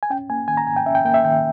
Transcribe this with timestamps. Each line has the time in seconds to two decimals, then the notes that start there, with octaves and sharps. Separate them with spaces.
0.03 G#5
0.10 C#4 G5
0.30 A#3 G#5
0.48 D#3 G#5
0.57 A#5
0.67 G#2 G#5
0.77 G5
0.86 C#4 E5
0.95 G5
1.05 A#3 G5
1.14 E5
1.24 D#3 G5